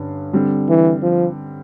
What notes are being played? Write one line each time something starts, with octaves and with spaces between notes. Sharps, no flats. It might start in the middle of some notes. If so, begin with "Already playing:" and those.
Already playing: G2 D3 C#4
D3 G3 C4
E3
F3